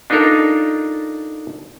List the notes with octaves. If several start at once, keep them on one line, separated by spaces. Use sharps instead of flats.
D4 D#4 F4 A4 A#4